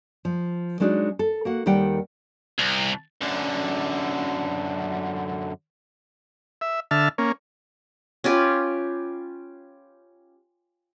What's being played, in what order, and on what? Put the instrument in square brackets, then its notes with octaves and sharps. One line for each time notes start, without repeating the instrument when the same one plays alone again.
[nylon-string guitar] F3
F#3 G#3 D4 D#4 F4 F#4
A4
A#3 F#4 F#5
D#2 D#3 G3 F#5 G5
[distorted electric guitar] C2
[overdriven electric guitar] F#2 D3
[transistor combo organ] E5
D3 E5 A5 F6
A#3 C#4
[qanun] C#4 F4 G4 B4